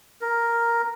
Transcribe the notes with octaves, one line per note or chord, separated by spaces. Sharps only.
A#4